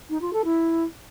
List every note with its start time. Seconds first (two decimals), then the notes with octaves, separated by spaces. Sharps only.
0.10 D#4
0.21 F4
0.33 A4
0.44 E4